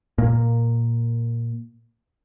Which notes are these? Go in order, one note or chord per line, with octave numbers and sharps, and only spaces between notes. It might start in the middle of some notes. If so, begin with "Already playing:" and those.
A#2 A#3